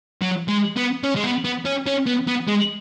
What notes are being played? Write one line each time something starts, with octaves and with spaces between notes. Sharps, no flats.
F#3
G#3
B3
C#4
G#3
B3
B3
C#4
C#4
B3
B3
G#3